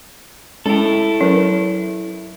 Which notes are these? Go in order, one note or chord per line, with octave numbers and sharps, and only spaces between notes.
G#3 C#4 E4 A4
F#3 C#4 A#4 B4